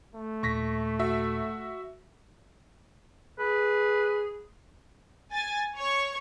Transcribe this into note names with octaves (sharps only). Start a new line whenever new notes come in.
A3
D#2 A#2 C#6 A#6 B6
F#4 E5
G#4 B4
G#5 A6
C#5 C#6